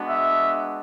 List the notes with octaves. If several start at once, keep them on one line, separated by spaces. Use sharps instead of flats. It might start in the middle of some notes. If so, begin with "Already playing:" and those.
Already playing: G#3 B3 D4 F#4
E5